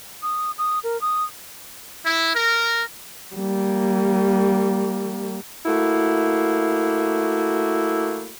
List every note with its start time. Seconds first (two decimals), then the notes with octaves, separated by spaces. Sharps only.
0.22 D#6
0.58 D#6
0.84 A#4
1.01 D#6
2.06 E4
2.35 A#4
3.36 G3 A#3
5.66 A3 A#3 E4 F#4